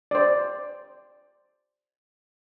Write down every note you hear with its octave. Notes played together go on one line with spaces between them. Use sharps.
C5 D5